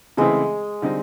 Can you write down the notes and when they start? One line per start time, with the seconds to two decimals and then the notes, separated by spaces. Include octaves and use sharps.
0.17 C#3 E3 G#3 A3 C4 E4
0.82 D3 G3 C4 D#4